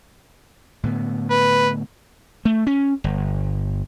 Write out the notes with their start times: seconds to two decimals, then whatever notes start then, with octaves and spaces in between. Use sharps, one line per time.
0.83 A2 D3 B3
1.31 B4
2.45 A3
2.67 C#4
3.04 G1